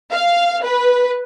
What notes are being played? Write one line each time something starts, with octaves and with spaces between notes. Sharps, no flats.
F5
B4